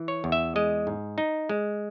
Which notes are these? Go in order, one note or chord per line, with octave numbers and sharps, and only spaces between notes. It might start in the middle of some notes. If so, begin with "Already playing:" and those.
Already playing: E3
C#5
E2
E5
G#3 D#5
G#2
D#4
G#3